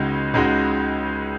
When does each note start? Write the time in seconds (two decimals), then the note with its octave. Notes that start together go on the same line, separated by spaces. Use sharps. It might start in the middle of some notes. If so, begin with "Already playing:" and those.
Already playing: C#2 C#3 G#3 D#4 F#4
0.34 C#2 C#3 G#3 D#4 F#4